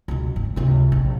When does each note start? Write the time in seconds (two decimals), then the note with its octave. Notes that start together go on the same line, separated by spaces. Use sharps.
0.08 C#2 B2
0.36 G1
0.56 C#2 C3
0.92 A#1